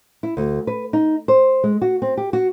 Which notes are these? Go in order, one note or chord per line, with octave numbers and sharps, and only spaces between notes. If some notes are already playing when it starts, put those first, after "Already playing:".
E4
D2
B4
D#4
C5
G#3
F#4
C4
G4
F#4